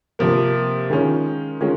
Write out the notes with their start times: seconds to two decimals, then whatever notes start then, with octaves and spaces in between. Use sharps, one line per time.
0.19 C3 F3 A#3
0.90 D#3 G#3 C#4 F4
1.61 D#3 G#3 C#4 F4